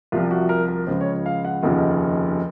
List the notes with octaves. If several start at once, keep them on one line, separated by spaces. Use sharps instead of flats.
C2 C3 F3 F4
F#4
A#4
A#4
C#2 C#3 F3 C5
C#5
F5
F#5
F1 D#2 C#3 F3